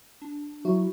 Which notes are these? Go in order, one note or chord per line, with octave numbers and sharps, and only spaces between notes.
D4
F#3 E4 F#4